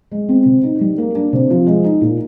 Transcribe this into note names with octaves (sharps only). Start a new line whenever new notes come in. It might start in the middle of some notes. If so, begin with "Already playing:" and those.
G#3
C4
C3
D#4
G3
A#3
D4
C3
F3
G#3
D#4
A#2